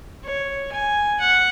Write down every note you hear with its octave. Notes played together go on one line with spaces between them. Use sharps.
C#5
G#5
F#5